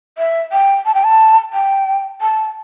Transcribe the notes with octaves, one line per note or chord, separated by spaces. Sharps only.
E5
G5
A5
G5
A5
G5
A5